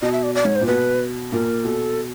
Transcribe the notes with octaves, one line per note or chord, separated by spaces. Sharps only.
B2 D#5
E5
D5
D5
G#2 C#5
C5
A#2
B2 B4
A#2 A#4
B2 A4